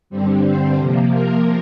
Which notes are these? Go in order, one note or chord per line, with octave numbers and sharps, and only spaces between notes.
G2 D3 G3 C4
C5
C3 F3 A#3
A#4